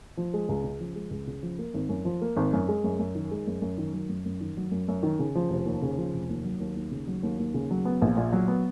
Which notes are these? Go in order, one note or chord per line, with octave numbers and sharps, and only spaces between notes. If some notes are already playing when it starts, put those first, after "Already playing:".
F3
G#3
C#2
C#3
F3
G#3
C#2
C#3
F3
A#3
G#1
F#2
F3
A#3
G#1
F#2
G#3
F#2
F#2
D#3
G#3
F#2
F#2
D#3
F#3
F#2
F#2
D#3
F#3
F#2
F#2
D#3
C#3
F3
F1
D#2
C#3
F3
F1
D#2
F#3
D#2
D#2
C#3
F#3
D#2
D#2
C#3
F#3
B3
A#1
A#2
F#3
B3